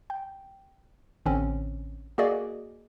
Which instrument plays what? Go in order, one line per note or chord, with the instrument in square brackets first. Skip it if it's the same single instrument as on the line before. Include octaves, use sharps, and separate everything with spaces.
[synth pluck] G5
A1 D3 C4 C#4
A#3 F#4 G#4 D5 D#5